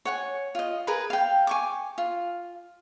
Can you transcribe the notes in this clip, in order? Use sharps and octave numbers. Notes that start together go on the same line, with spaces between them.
C#5 F#5 G#5
F4 D#5
G#4 A#4 B4 B5
F5 G5
G#5 C#6 D6
F4